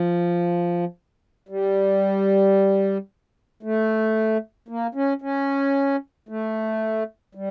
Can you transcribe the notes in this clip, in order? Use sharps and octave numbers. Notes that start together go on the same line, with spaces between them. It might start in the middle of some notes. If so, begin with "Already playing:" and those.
Already playing: F3
G3
A3
A#3
C#4
C#4
A3
G3